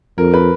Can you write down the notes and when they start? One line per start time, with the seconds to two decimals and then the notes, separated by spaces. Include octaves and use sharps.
0.18 F2 A#4
0.34 B4